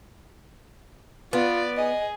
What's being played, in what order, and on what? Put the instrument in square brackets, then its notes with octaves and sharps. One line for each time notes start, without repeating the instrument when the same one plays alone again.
[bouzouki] B3 [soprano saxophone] F4 [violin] D5
[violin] G#4 [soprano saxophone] D#5